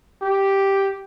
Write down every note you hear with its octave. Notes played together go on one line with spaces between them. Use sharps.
G4